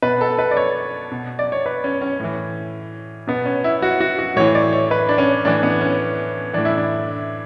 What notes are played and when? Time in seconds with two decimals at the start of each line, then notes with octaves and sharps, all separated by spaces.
0.02 B2 B4
0.21 A4
0.39 B4
0.51 D5
0.57 C#5
1.12 B2
1.39 D5
1.52 C#5
1.66 B4
1.84 C#4
2.01 C#4
2.19 A2 E3
3.27 B2 B3
3.45 C#4
3.64 E4
3.82 F#4
4.00 F#4
4.19 F#4
4.36 A2 E3 C#5
4.55 D5
4.73 C#5
4.91 B4
5.09 D4
5.18 C#4
5.45 A2 E3 D4
5.63 B3
5.81 C#4
6.53 A2 E3 D4
6.65 E4
6.77 D4